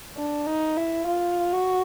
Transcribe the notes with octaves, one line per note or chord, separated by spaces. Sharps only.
D4
D#4
E4
F4
F#4